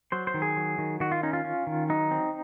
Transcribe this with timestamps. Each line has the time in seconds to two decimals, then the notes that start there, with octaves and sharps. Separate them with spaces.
0.12 F#3 C5
0.27 C5
0.34 D#3
0.42 G#4
0.57 F#3
0.78 D#3
1.00 D#3 F#4
1.12 F4
1.23 C#4 D#4
1.33 F4
1.45 C#4
1.67 D#3
1.89 F#3 D#4
2.11 C4